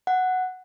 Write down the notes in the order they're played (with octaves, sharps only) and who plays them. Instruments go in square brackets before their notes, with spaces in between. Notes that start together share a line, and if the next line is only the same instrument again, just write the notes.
[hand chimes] F#5